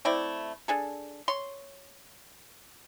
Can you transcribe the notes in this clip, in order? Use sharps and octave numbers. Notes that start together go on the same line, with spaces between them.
A3 C4 E4 D5
D4 G#4 A4
C#5 C6